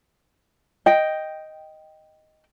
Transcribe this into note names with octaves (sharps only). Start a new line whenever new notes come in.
D#5 G5